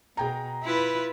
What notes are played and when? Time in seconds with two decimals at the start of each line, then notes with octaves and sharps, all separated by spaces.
0.17 B2 G#4 G5 A#5
0.63 E4 F4 B4